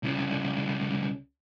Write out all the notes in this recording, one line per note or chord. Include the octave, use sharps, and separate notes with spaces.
C2 C#3